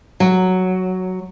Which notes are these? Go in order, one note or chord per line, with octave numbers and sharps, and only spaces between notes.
F#3